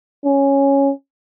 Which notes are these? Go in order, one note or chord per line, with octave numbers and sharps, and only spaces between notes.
C#4